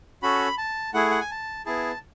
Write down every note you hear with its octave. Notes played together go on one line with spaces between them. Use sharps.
C#4 F#4 A4 B5
A5
A3 E4 G#4 F#5
F#5
G#5
A5
B3 E4 G#4 A5